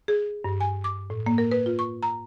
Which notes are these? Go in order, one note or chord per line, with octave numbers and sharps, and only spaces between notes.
G#4
G2
G#5
D6
A2
A#3
A#4
B4
F4
C#6
A#5